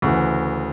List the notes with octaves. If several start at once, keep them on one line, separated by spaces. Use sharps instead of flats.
D2 C#3 E3